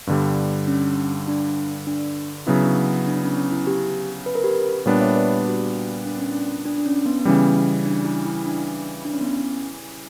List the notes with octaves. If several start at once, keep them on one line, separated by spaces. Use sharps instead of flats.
G2 D3 G3 B3
C#4
D4
D4
C#3 F#3 B3 C#4 E4
D4
C#4
D4
C#4
C#4
E4
G4
B4
A#4
G4 B4
A#2 G3 B3 D4 A#4 C#5
C#5 E5
B4 D5
G4
F#4
D4
C#4
D4
D4
D4
C#4
B3
B3
C#3 E3 G3 C#4
D4
E4
E4
D4
D4
C#4
B3
C#4